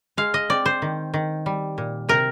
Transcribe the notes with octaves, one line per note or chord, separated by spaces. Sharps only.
G#3 F5
D#5
C4 D5
C5
D#3
D#3
G3
A#2
C3 A#4